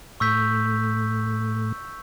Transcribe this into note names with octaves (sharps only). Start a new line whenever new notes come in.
A2 C#6 E6 G6 B6